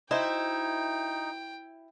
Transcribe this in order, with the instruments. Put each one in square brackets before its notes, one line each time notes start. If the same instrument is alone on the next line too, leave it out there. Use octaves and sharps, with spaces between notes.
[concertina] D#4 [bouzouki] E4 [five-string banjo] F#4 C5 D#5 [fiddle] G5